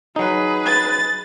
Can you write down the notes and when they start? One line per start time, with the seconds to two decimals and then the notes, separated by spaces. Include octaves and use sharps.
0.16 F#3 D#4 G#4 B4
0.67 A6